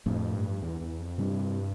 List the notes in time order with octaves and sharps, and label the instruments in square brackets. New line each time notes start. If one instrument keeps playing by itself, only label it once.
[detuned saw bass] F2 [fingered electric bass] A2 F3 A3 D4
[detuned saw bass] G2
E2
E2
F2
[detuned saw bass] G2 [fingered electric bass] C3 G3 D4